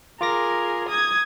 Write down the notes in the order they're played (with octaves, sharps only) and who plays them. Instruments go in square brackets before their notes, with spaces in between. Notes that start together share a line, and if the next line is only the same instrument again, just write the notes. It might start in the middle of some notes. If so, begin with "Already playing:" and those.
[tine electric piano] F4 D6 A#6 [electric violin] G#4 A#4
[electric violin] D#6 G#6